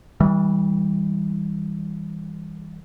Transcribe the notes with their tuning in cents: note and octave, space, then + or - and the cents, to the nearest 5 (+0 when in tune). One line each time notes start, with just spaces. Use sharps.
E3 -30 G3 +10